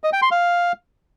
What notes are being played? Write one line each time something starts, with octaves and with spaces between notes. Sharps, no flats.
D#5
G5
C6
F5